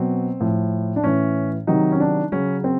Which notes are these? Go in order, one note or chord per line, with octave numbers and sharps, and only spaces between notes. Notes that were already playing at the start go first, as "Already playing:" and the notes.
Already playing: B2 F#3 C4
A2 F3
D4
A2 E3 C#4
C3 D#3 F#3 D#4
C#4
D4
C#3 F#3 C#4
C4